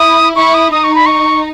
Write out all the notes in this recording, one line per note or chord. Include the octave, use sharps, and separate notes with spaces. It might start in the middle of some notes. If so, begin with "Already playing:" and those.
Already playing: E4 D#6
E4 C#6
D#6
D#4 D#6
C#6
B5
C#6